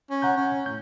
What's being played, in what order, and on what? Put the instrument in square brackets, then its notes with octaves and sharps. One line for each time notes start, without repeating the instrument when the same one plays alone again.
[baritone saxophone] C#4
[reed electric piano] F#5 A#5 G6
[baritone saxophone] C#4
[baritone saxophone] A2 [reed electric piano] G6